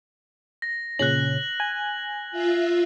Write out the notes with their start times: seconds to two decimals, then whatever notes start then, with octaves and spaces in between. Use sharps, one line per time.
0.62 A#6
0.99 A#2 C#3 C#4 F#6 F#7
1.60 G#5
2.31 F4 E5